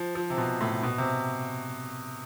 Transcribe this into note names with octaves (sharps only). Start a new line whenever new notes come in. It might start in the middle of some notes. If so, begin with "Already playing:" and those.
Already playing: F3
F3
C3
B2
A2
B2
C3